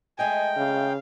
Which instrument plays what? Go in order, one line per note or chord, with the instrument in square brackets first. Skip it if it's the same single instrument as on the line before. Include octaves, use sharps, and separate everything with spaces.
[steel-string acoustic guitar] G#3 A3 D#5 [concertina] G5 [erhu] G#5
[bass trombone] C#3 [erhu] F5